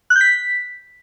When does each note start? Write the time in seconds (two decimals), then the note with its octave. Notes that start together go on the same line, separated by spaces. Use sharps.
0.10 F#6
0.16 G6
0.21 B6